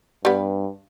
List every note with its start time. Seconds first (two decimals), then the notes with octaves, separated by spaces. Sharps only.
0.25 G2 G3 B3